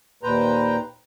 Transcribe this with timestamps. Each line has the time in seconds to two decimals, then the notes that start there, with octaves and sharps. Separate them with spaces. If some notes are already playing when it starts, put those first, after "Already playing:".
0.23 D#2 A#2 B4 C5 G5 A#5